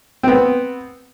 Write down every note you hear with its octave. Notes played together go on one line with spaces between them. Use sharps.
B3 C4